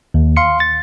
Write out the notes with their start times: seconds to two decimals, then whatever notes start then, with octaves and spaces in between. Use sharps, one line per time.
0.14 D#2
0.37 F5 C6 C#7
0.60 A6